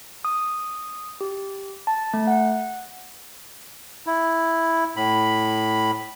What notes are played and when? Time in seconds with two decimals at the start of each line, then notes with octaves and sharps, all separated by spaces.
0.25 D#6
1.21 G4
1.87 A5
2.14 A3
2.27 F#5
4.07 E4
4.96 A2 B5